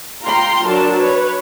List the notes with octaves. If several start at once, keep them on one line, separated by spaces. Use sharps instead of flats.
F4 G5 A#5 C6
F#3 D4 A#4 A5
B4 C#5